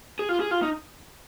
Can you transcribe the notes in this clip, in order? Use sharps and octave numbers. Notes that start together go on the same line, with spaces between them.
G#4
F4
G#4
F4
D#4